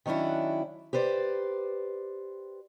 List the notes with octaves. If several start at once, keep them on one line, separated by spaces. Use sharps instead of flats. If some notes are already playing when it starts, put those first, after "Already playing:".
D#3 F#3 C#4 D4 E4
G4 B4 C5 D5